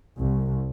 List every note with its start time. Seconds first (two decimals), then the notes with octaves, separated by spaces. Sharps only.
0.17 C2